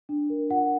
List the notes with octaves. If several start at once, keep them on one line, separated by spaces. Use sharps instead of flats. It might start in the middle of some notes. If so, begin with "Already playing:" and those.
D4
A#4
F4 F#5